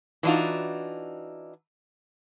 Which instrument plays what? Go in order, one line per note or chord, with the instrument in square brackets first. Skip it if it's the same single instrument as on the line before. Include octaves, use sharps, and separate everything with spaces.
[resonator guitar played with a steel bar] E3 G3 D4 D#4 F4 F#4